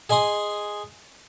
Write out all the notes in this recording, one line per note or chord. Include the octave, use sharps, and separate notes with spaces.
G#4 D#5 G#5 C6 D#6